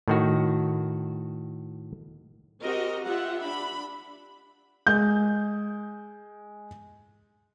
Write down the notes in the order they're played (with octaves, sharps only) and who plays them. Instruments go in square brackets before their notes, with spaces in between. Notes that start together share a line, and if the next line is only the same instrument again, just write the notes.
[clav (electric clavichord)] A2 D#3 F#4
[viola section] C4 F#4 G4 A#4 D#5
F4 G4 E5 F#5
D4 B5
[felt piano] G#3 G6